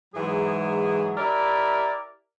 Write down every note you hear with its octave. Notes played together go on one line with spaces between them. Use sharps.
G#2 E3 F#3 G#4
E4 G4 A#4 D5 E5